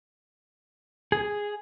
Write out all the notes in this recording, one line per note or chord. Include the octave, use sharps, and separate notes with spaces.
G#4